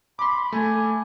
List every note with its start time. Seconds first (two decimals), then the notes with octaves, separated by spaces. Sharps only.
0.19 B5 C6 D6
0.52 A3 G#5